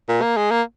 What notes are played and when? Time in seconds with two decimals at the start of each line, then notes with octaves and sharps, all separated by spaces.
0.09 A#2
0.22 A#3
0.37 G#3
0.51 A#3